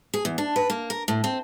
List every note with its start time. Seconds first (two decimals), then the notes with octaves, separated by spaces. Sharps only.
0.14 G#4
0.25 E2
0.38 D4
0.56 B4
0.70 A#3
0.90 A#4
1.08 A2
1.24 C4